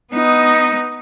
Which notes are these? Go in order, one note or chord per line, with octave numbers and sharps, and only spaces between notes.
B3 D#4